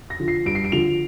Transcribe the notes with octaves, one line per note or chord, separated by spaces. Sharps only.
A#6
D3 F3
C7
G2 D7
C7
D7
D3 F3 F7